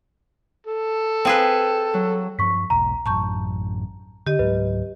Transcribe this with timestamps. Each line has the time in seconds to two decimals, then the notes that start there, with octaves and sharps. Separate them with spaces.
0.67 A4
1.25 C4 G#4 B4 F5 G5
1.94 F#3
2.39 G2 F3 C#6 B6
2.70 E1 B1 A#5
3.06 A1 F#2 A5 C#6 G6
4.27 D3 G4 D#5
4.39 C#2 G#2 F#3 B4